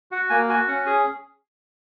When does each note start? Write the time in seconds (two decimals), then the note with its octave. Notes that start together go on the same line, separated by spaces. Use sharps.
0.11 F#4 F#5
0.30 A#3 G#5
0.49 F#4 G#5
0.68 C#4 F#5
0.86 G#4 G#5